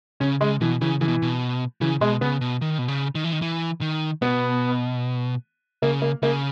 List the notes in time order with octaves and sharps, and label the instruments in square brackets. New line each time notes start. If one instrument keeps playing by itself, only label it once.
[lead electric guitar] C#3 [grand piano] C#4
[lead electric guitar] C#3 [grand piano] G#3
[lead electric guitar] B2 [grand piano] E3
[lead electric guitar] C#3 [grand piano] E3
[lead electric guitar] C#3 [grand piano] E3
[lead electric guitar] B2
B2
[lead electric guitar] C#3 [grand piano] E3
[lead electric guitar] B2 [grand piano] G#3
[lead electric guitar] C#3 [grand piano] B3
[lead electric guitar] B2
D#3
B2
C#3
D#3
E3
D#3
E3
D#3
[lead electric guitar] B2 [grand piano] B3
[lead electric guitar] C#3 [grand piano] A#3
[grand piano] A#3
[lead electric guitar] C#3 [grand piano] A#3